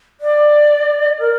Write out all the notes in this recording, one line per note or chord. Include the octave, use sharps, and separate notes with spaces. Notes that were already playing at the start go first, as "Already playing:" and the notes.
D5
A#4